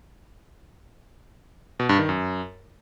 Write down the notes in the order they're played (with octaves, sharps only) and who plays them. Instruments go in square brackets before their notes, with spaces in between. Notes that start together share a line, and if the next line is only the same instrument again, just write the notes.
[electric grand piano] B2
G2
D#3
F#2